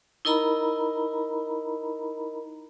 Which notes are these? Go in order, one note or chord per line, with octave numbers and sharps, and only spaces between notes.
D#4 E4 A#4 D#5 A#5 B5